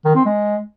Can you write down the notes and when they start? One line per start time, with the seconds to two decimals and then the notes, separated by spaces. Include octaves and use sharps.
0.05 D#3
0.15 C4
0.25 G#3